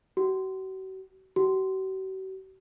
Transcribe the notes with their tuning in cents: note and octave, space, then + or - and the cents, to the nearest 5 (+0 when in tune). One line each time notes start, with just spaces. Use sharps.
F#4 +40
F#4 +45